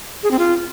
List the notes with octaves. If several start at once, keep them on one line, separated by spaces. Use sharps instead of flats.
G#4
C4
F4